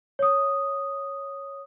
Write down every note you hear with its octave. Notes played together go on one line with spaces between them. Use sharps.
C#5 D#6